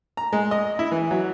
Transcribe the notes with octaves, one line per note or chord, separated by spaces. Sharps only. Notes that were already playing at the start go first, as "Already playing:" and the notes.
A#5
G#3
D#5
E4
E3
F#3